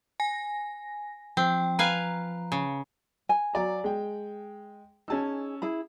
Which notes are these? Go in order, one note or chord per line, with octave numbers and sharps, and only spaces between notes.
G#5 A#6
F3 C4 G5
B4 F5 G#5 A#5
C#3
G#5
F#3 D5 A#5
G#3 G5
C#4 D#4 G#4 A5 E6
E4 G#4 B5